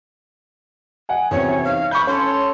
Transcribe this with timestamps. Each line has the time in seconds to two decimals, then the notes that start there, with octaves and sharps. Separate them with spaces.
1.09 D#5 F#5 G#5
1.31 E2 C3 F#3 C4 C#4 C#5
1.64 D#4 F5
1.91 B5 C#6 G6
2.07 C#4 A4 C#5 C6